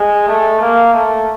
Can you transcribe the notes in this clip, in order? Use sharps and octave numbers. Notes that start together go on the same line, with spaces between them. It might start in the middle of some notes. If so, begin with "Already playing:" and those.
Already playing: G#3
A3
A#3
A3